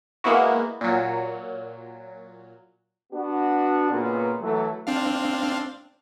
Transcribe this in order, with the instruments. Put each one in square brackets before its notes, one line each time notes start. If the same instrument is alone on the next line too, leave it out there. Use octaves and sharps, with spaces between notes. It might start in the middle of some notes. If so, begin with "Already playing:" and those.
[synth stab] G#3 A#3 B3 E4 F#4
A#2 F#3
[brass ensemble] B3 D4 F#4
C#2 A#2 B3
E3 F#3 A3
[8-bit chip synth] C4 D4 F5